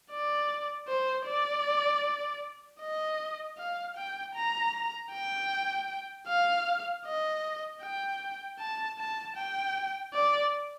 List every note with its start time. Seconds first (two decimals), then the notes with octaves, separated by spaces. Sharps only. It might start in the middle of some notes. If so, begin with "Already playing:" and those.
0.11 D5
0.88 C5
1.27 D5
2.81 D#5
3.58 F5
3.97 G5
4.36 A#5
5.12 G5
6.28 F5
7.06 D#5
7.82 G5
8.59 A5
8.99 A5
9.36 G5
10.14 D5